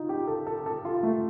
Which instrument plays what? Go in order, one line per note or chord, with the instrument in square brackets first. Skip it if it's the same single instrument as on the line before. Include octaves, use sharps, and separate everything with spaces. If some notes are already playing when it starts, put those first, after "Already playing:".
Already playing: [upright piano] D#4 F4
G4
A4
A4
A4
F4
A3